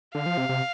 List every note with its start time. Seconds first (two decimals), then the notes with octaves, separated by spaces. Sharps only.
0.15 D3 F5
0.26 F3
0.37 C3
0.49 C3